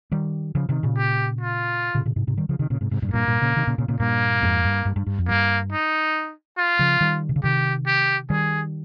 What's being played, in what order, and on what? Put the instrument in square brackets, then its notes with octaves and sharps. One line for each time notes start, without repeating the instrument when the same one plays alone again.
[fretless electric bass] D#3 G3
C#3 F3
C3 D#3
A#2 C#3
[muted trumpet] G4
F4
[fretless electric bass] A#2 C#3
A#2 C#3
G#2 C3
G#2 C3
D#3 G3
C#3 F3
C3 D#3
A#2 C#3
G#2 C3
G#2 C3
G2 A#2
G#2
[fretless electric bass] G2 A#2 [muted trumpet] A#3
[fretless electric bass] G2 A#2
A#2 C#3
C3 D#3
A#2 C#3
A#2 C#3
A#2 C#3
[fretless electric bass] G2 A#2 [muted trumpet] A#3
[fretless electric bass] F2 G#2
G2
G2
G2
G2
F2
[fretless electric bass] G2 [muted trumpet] A#3
[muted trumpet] D#4
F4
[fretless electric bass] C#3 F3
D#3 G3
C3
C#3
[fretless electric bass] C3 D#3 [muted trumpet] G4
[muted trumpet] G4
[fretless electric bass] D#3 G3 [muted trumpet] G#4